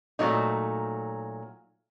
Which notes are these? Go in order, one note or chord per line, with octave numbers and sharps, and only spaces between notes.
A#2 D3 F#3 A3 D#4